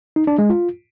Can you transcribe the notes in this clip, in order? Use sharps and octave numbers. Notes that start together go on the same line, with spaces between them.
D#4
D4
G#3
F4